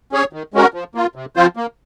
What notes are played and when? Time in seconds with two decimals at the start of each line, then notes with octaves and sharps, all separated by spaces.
0.12 C#4 G#4 C#5
0.33 D#3
0.54 G#3 C#4 F#4 A#4
0.74 F3
0.95 A#3 F4
1.16 C3
1.36 F3 C4 F4 C5
1.56 A#3